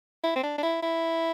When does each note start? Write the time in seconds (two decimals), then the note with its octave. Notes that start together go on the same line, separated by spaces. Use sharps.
0.24 E4
0.36 C4
0.43 D4
0.58 D4
0.63 E4
0.83 E4